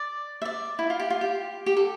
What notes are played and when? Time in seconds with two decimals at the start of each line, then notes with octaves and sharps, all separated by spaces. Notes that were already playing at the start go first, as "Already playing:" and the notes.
Already playing: D5
0.42 E5
0.45 D5
0.79 E4
0.90 F4
1.00 G4
1.10 F4
1.21 G4
1.66 G4
1.77 A4